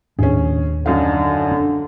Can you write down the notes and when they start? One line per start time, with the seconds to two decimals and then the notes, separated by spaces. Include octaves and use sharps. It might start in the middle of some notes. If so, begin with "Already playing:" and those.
0.19 D#2 A2 C#4 D4 G#4
0.86 F#2 D3 D#4 F5
1.52 D4